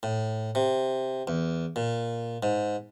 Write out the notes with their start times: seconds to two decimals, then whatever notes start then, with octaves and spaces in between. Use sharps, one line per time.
0.03 A2
0.55 C3
1.27 E2
1.76 A#2
2.43 G#2